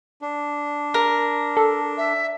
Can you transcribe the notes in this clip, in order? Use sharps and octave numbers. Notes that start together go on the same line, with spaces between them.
D4
A#4
A4
E5